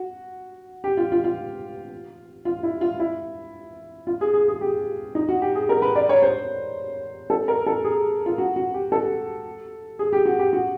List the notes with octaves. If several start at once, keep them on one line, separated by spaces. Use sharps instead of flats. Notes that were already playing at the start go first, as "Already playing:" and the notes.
Already playing: F#4
G4
F4
F4
F4
F4
E4
F4
E4
F4
G#4
G#4
G#4
G4
D#4
F#4
G4
G#4
A#4
B4
D5
C#5
C5
A4
A#4
A4
G#4
F4
F#4
F#4
G4
A4
G#4
G4
F#4
G4
F#4